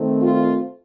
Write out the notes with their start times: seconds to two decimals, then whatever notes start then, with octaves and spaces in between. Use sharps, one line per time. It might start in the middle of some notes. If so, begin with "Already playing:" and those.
Already playing: D#3 A3 C4
0.22 F4